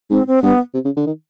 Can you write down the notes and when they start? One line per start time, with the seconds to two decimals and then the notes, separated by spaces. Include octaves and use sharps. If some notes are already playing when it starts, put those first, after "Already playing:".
0.10 G#2 C4
0.27 C4
0.43 G2 B3
0.74 C3
0.85 C#3
0.96 D3
1.07 D#3